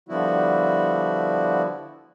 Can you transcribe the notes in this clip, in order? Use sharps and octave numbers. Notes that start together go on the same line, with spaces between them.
D3 F3 G3 B3 E4 F#4